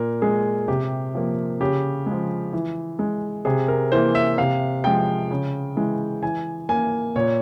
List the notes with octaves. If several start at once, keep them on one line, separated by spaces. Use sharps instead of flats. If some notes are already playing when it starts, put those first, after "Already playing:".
Already playing: A#2 A#4
G#3 G#4
C3 G4
F3 A#3
C#3 G4
G#3
F3
E3
G#3
C3 G#4
A#4
E3 A#3 C5
E5
C3 F5
F3 G#3 G5
C#3
E3 G#3
E3 G#5
A#3 G#5
A#2 C#5